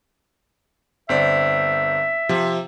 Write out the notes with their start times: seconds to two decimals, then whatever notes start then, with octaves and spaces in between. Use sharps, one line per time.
1.09 G1 C4 D5 E5
2.29 C3 F3